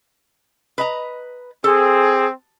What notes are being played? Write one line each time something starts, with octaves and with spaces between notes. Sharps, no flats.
B4 D#5 A#5
C4 G#4 A4